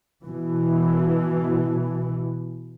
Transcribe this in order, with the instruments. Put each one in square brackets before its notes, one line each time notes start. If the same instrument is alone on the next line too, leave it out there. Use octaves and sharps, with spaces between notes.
[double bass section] B2 E3